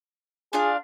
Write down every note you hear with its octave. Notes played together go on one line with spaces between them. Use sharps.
D4 F4 G#4 F5